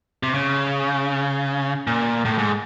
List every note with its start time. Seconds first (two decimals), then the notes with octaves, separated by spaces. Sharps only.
0.23 C3
0.34 C#3
1.87 A#2
2.25 A2
2.38 G#2